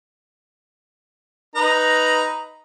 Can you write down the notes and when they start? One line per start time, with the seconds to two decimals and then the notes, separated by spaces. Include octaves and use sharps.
1.55 D#4 B4 A#5